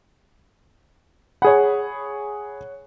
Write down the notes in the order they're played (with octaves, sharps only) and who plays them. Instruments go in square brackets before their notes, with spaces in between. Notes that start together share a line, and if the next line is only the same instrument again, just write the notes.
[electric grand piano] G#4 B5 [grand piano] C#5 F#5